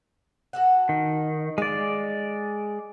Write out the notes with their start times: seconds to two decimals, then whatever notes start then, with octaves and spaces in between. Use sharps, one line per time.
0.53 F#4 A4 F#5
0.89 D#3
1.58 G#3 D5 F5